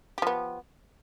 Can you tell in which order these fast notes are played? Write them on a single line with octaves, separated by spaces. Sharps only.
G4 F3 B3